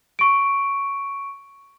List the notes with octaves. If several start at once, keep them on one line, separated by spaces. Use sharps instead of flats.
C#6 D7